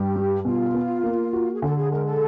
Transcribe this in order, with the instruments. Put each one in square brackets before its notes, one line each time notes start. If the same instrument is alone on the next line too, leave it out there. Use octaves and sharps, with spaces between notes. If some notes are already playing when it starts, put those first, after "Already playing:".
Already playing: [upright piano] G2 [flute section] G4
[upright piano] G3
[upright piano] B2 [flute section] F4
[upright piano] B3
A#3
F#4
[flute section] G#4
[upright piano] D3 [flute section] A4
[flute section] G#4
[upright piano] G#3 [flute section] A#4
[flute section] A4